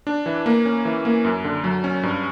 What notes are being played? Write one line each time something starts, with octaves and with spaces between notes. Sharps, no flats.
D4
E3
A#3
C#4
E3
A#3
F#2
D3
F#3
C#4
G2